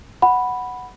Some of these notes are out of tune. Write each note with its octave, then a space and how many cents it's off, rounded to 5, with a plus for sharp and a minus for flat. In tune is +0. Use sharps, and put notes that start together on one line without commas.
F#5 +0 B5 +0